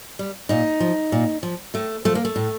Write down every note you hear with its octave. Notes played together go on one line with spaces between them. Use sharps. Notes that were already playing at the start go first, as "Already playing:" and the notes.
G3
A#2 D#4
F3
A#2
F3
A2 A3
F3 A3
A#3
A3
A2